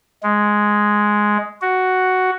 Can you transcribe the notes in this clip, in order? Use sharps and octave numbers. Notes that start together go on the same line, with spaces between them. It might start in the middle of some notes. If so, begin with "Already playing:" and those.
G#3
F#4